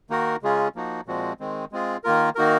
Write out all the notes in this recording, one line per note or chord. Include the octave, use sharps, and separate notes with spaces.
D#3 A#3 D#4 F#4 A#4
C#3 G#3 C#4 F4 G#4
F3 A#3 D#4 F#4
A#2 F3 G#3 C4 F#4
D#3 G#3 C4
G#3 C4 F4 G#4
D#3 A#3 F4 A#4
D#3 A#3 D#4 F#4 A#4